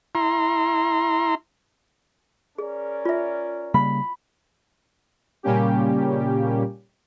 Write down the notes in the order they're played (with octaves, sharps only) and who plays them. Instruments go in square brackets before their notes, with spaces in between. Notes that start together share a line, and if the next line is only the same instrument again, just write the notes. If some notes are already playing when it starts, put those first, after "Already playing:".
[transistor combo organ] E4 A#5 C6
[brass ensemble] C#4 A#4 D5 [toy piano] G#4
[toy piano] F4 E5
[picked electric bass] C#3 G3 A#3 [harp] B5
[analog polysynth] A#2 C#3 G3 A#3 C#4 G4